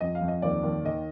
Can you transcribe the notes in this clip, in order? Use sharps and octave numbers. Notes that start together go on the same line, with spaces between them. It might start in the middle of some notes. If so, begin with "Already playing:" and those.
F2 D#5
F5
F2
D#5
D#2 D5
D#2
D#3 D#5